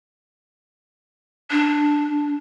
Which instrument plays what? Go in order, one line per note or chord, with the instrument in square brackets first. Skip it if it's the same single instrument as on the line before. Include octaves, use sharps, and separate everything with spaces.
[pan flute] D4